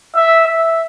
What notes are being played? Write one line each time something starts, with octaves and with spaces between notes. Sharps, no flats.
E5
E5